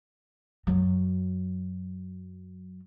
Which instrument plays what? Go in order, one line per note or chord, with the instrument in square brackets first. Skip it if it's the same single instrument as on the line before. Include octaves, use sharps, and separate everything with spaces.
[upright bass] F#2 F#3